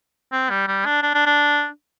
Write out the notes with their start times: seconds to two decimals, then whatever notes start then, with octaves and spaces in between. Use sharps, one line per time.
0.32 C4
0.50 G3
0.68 G3
0.85 D4
1.03 D4
1.14 D4
1.26 D4